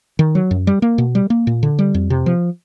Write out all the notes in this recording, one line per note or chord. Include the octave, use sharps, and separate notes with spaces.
D#3
F#3
F#2
G3
A#3
B2
G3
A#3
A#2
D3
G3
F2
C3
F3